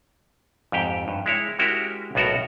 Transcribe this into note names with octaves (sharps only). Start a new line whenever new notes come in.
F2 G#2 G4 G5
G2
G#3 E4 C#5
G#3 C#4 E4 F#4 G4 A#4
B1 A2 B3 F#4 A4 A#4